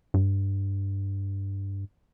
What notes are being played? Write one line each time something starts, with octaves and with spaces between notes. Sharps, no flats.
G2